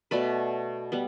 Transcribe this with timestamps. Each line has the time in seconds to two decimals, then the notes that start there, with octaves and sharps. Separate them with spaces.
0.11 B2 A3 B4 D5
0.92 G3 B3